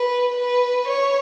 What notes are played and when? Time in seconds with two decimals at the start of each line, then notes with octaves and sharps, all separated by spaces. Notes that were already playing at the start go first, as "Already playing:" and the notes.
Already playing: B4
0.37 B4
0.88 C#5